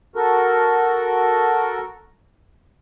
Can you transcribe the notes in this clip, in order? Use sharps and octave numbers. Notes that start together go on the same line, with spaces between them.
F#4 A4 A#4